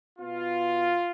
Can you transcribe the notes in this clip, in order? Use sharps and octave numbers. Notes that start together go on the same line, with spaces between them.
B2 B3 F4